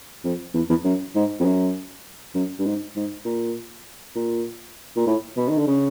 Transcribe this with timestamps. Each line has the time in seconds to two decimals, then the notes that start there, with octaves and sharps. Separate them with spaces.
0.24 F2
0.54 E2
0.70 E2
0.84 F#2
1.15 G#2
1.40 F2
1.45 F#2
2.35 F#2
2.59 G2
2.66 G#2
2.96 G#2
3.25 A#2
4.16 A#2
4.96 A#2
5.07 A2
5.37 B2
5.49 D#3
5.58 D3
5.67 C#3